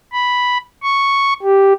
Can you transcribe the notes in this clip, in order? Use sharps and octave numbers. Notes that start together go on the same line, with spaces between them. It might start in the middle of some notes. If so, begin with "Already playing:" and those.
B5
C#6
G4